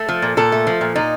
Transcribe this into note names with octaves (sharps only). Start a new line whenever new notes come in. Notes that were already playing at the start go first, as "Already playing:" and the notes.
Already playing: A3 A4
F3
A#2
A#2 A4
A3
F3
A#2
A#2 D#4